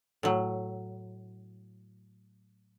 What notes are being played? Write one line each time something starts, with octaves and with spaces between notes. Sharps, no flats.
A2 F#3